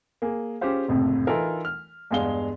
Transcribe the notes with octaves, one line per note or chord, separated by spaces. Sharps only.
A#3 G#4
C#4 F4 G4 G#4 C5 F5
F#1 F2 A2 C3
E3 D#4 F4 A4 A#4
F6
E2 G2 G#3 F5 G7